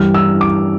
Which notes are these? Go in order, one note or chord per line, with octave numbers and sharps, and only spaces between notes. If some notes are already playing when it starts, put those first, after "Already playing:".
Already playing: G2 E3 G3 F6
E6
D6